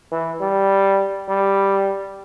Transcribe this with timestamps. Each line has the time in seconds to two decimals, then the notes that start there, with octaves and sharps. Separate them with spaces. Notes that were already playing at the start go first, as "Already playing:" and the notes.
0.11 E3
0.40 G3
1.29 G3